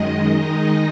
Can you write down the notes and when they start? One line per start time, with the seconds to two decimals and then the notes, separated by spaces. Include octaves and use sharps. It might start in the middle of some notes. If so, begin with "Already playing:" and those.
Already playing: F#2 D#3 G#3 D#5
0.32 D#3 G#3 D#4